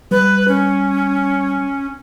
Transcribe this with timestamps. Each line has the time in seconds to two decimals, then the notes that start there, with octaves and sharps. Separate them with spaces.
0.11 G3 B4
0.48 C#4